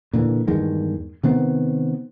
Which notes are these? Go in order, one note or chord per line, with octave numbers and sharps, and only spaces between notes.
A#2 D3 E3
E2 G2 D#3 G#3
C3 D#3 B3 C4